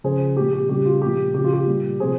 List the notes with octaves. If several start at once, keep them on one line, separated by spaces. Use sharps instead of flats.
C#3 F3 G#4 C5
A#2 F3 G4
G4
C#3 G3 G4
F4
A#2 F3 G4
C#3 F3 G4
F4
G4
A#2 G3
C3 F3 G#4 C5